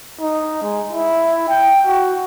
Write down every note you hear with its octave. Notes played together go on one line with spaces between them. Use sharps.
D#4
G#3
E4
G5
F#4